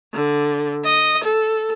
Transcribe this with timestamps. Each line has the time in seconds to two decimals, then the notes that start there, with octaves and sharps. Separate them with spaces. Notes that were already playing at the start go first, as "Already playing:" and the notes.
0.13 D3
0.85 D#5
1.24 A4